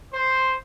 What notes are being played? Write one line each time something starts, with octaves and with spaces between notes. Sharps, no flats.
C5